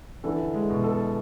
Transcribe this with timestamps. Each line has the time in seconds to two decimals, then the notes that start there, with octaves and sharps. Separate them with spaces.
0.24 D3 E3 A4
0.54 G#3
0.70 B2
0.84 A4